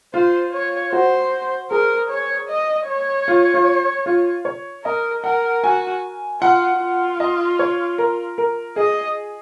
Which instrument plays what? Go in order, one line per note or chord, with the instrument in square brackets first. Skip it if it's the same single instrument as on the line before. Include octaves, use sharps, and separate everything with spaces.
[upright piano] F4 [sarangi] C5
[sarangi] C#5
[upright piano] F#4 [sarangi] C5
[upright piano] G#4 [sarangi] A#4
[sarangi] C#5
D#5
C#5
[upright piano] F4
F4
F4
C#5
[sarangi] A#4 [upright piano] D#5
[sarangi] A#4 [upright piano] F#5
[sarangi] F#4 [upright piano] G#5
[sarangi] F4 [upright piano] F#5
[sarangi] F4
[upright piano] D#5
C#5
A#4
A#4
[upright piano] G#4 [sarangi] D#5